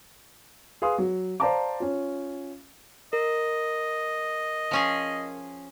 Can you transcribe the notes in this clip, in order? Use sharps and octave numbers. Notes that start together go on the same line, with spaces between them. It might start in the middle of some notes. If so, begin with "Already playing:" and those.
G#4 B4 F5 C6 D#6
F#3
C5 D5 F5 A5 A#5 D6
C#4 F4
A#4 D#5
F3 C#4 G#4